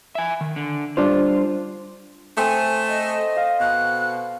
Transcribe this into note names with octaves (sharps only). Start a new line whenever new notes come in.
E5 G#5
D#3
D3
G3 D4 F4 C5
A3 C4 A4 G#5 D#6
D#5
F5
B2 F#6